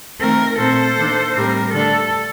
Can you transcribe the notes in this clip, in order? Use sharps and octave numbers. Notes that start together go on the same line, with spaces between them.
D#3 A3 C4 A#4
A#2 A3 C4 A4 C5
D#3 A#3 D4
A2 G3 C4 A#4
D3 A3 D4 A4